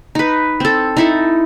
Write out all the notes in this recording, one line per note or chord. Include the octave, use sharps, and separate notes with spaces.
D#4 B4
C4 A4
D#4 E4 A4